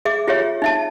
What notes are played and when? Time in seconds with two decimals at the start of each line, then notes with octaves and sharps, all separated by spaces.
0.05 G#4 E5 D6
0.27 F4 G4 G#4 C#5 E5
0.62 D#4 E5 A5